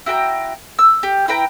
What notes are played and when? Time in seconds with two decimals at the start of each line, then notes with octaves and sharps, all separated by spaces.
0.06 E4 F#4 G5 A#5
0.79 E6
1.03 G4
1.28 E4 B4 G5 A#5